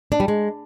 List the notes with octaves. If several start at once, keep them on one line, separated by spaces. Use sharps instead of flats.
D4
G3
G#3